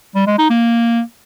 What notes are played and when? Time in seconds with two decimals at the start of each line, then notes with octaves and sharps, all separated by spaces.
0.15 G3
0.27 G#3
0.38 D#4
0.50 A#3